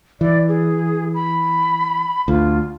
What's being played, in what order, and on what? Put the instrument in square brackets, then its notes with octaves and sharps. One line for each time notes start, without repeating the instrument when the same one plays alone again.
[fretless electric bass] E3 [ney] D5
[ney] G#4
B5
[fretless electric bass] D2 [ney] F4